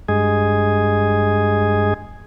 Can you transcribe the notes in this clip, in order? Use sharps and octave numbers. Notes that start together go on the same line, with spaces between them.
G2 G#3 G#4